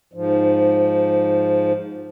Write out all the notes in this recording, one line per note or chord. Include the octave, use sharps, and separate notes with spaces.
G#2 F3